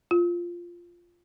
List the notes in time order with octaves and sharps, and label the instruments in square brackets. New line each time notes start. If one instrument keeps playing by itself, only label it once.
[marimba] F4